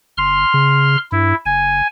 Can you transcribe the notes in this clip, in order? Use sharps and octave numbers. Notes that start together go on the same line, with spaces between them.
G1 C6 F6
C#3
G2 E4
F#1 G#5